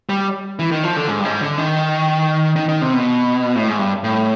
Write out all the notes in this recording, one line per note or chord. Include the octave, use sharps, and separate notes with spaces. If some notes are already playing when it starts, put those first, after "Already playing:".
G3
E3
D#3
F3
D3
G#2
G2
G#2
D3
D#3
D#3
D#3
C3
B2
A2
G#2
G2
A2